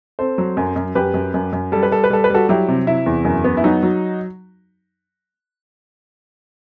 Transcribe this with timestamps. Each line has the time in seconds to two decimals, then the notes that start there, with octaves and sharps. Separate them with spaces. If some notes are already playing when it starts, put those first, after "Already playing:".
0.19 C4 A4 C5
0.38 F#3
0.57 F#2
0.76 F#2
0.95 F#2 G4 B4
1.14 F#2
1.34 F#2
1.53 F#2
1.72 G3 A4
1.83 B4
1.91 G3 A4
2.04 B4
2.10 G3 A4
2.24 B4
2.30 G3 F#4 A4
2.49 F#3 E4 G4
2.68 C3
2.87 C3 E4
3.06 E2
3.25 F#2
3.44 B3
3.57 E4
3.64 F#3 D#4 F#4
3.83 F#3